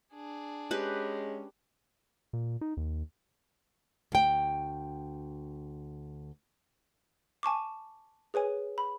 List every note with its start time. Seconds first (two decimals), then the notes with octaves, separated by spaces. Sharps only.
0.14 D4 G#4
0.71 G#3 C#4 G4 B4
2.33 A#2
2.61 D#4
2.77 D#2
4.12 D2 G5
7.43 G#5 A5 C#6 D6
8.34 G#4 B4 C#5 G#5
8.78 B5